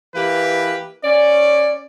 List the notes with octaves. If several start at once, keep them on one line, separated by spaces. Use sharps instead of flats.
E3 A#3 G4 B4
C#4 D5